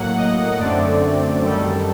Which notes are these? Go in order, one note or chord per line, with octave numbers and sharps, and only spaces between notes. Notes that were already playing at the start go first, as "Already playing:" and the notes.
Already playing: A2 F#3 A#3 F#5
D#5
F#2 D3 A3 C4 D5
F#2 D#3 G3 A4